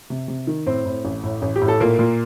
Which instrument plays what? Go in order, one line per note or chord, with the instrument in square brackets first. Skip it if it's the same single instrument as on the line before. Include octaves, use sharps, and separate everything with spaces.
[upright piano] C3
C3
D#3
A2 C4 C5
A2
A1
A2
A1
G4
A2
A4
A#2 A#3 A#4
A#2